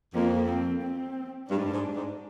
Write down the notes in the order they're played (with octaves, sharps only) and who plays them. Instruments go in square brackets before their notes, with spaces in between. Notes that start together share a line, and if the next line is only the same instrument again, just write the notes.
[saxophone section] F2 [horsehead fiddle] A#3
[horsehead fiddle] C4
C4
[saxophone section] G2 [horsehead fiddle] D4
[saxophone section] G#2
G2
G#2
G#2